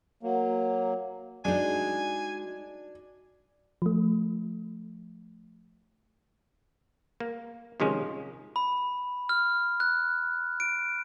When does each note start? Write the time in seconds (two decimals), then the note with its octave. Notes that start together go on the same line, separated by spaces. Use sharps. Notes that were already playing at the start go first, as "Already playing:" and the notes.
0.23 F#3 A#3
1.45 G#3 D4 D#4 F#4 G#5
3.82 F3 A3
7.20 A#3
7.80 C3 D#3 F3 G#3 C#4
8.56 B5
9.29 F6
9.80 F#6
10.60 D7